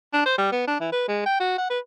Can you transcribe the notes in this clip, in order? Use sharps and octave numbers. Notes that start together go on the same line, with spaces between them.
D4
C5
G3
B3
D4
E3
B4
G#3
G5
F#4
F#5
B4